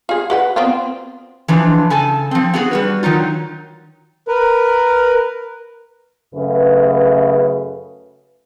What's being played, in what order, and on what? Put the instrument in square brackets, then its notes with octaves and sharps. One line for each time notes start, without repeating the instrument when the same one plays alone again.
[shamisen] F4 G#4
F#4 B4 F#5
B3 C4 F4
[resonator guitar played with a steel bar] E3 F3 D4 F4
C#3 A4 G#5 A5
F3 C4
B3 F#4 G#4
G3 F#4 B4
D#3 F#3 D#4 F4
[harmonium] A#4 B4
[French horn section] F#2 C#3 A3 B4